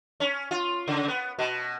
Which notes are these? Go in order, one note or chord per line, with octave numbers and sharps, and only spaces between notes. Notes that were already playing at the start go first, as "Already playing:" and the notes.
C#4
F4
C#3
B3
B2